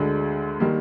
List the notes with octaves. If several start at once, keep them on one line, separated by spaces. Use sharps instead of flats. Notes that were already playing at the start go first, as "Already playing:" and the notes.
Already playing: D2 D3 G#3
D#3 G3 A#3